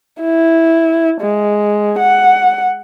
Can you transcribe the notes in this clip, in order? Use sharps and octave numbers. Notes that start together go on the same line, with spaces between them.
E4
G#3
F#5